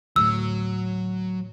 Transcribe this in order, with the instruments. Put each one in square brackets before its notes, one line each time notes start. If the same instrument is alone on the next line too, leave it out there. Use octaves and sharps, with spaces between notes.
[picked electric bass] D2 A2 [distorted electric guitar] F#3 [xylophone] E6